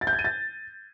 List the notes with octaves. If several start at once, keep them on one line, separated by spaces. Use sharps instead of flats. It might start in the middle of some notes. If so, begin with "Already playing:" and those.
A6
G6
G#6
D#7
A6